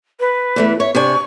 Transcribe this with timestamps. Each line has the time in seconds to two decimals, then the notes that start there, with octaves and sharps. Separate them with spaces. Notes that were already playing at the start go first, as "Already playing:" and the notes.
0.20 B4
0.56 E2 E3 A3
0.80 C#5 E5
0.95 C3 D4 G#5 C#6